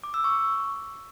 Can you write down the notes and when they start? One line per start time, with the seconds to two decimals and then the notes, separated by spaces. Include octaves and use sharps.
0.04 D6
0.14 E6
0.24 C#6